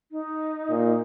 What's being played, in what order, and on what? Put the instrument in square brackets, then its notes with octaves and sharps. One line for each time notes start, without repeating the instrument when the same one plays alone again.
[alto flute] D#4
[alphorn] A#2